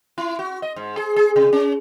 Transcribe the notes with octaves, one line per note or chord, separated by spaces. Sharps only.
E4
F#4
D#5
G#2
G#4
G#4
C3
C#4